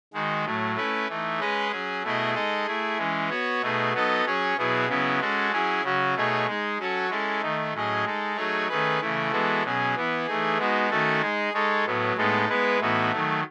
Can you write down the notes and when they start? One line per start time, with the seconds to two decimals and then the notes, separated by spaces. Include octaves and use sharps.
0.14 D#3 G#3 D#4 F#4
0.45 A2 F#3 A3
0.76 A3 C#4 E4 B4
1.08 E3 A3 D#4
1.40 G#3 C#4 G#4 B4 D#5
1.71 F#3 C#4 G#4
2.03 B2 A3 E4 G#4 D#5
2.34 G#3 D#4 A4 D#5
2.66 A3 E4 G#4
2.98 E3 G#3 C#4
3.30 B3 F#4 C#5
3.62 B2 A3 D#4 G#4
3.93 F#3 B3 D#4 A4 D#5
4.25 F#3 C#4 G#4 C#5
4.57 B2 F#3 B3 E4 G#4
4.88 C#3 F#3 B3 E4
5.20 G#3 C#4 F#4 A4
5.52 F#3 C#4 E4 G#4
5.83 C#3 F#3 C#4 F#4
6.15 B2 A3 D#4 G#4 C#5
6.46 G#3 D#4 G#4
6.79 F#3 C#4 F#4 A4 C#5
7.10 G#3 C#4 E4 A4
7.41 D#3 A3 D#4
7.73 A2 F#3 C#4 G#4 D#5
8.05 G#3 D#4 A4
8.36 F#3 A3 D#4 G#4 C#5
8.69 D#3 A3 C#4 G#4 B4
9.00 C#3 E3 A3 E4
9.31 E3 G#3 B3 F#4 A4
9.63 B2 F#3 C#4 G#4
9.95 E3 B3 E4
10.27 E3 A3 D#4 G#4
10.58 G#3 B3 D#4 F#4
10.90 D#3 A3 C#4 F#4 A4
11.21 G#3 D#4 G#4
11.53 G#3 D#4 A4 C#5
11.85 A2 F#3 B3
12.16 A2 G#3 B3 D#4 A4
12.48 G#3 B3 E4 B4
12.80 A2 E3 B3 D#4 F#4
13.12 D#3 F#3 A3